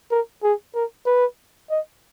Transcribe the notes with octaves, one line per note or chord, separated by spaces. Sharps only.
A#4
G#4
A#4
B4
D#5